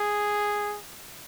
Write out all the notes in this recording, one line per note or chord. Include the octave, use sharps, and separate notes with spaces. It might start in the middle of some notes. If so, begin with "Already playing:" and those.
Already playing: G#4